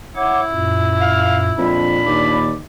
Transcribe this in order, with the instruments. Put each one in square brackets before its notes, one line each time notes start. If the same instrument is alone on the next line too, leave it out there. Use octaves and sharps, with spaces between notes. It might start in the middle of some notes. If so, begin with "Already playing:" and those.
[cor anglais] E4 [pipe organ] C#5 F#5 D6
[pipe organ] F#2 A#2
[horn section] F5
[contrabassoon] F2 [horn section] A#2 B5 [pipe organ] D4
[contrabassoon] D#2 [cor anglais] D5